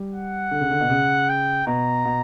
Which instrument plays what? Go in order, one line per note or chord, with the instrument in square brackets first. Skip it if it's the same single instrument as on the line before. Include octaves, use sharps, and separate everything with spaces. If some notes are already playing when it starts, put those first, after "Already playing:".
Already playing: [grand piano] G3
[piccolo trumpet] F#5
[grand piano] D3
C#3
D3
B2
C#3
[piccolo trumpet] G5
[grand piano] B2 [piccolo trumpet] A#5
[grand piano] B2